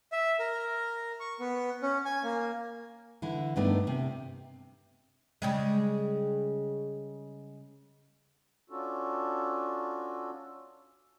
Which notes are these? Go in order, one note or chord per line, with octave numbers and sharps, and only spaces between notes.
E5
A#4
C#6
B3
C#4
G#5
A#3
D3 E3 E4
G2 D#3 A3 B3 D4 A#4
C3
C#3 G3 G#3
C#4 D4 F4 F#4 A4